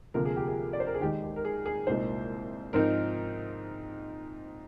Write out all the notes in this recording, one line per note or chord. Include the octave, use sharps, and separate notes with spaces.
D2 C3 F3 A#3 A#4
G#4
G4
G#4
D5
C5
A#4
G#4
D#2 D#3 G#3 D#4 G4
G4
A#4
G#4
G#4
C2 A#2 G#3 D#4 C5
G#2 F3 C4 D#4 A#4